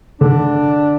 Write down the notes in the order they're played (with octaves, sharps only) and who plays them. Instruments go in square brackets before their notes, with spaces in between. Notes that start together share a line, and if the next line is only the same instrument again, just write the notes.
[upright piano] D3 [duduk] D4